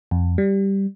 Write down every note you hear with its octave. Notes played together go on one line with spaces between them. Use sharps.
F2
G3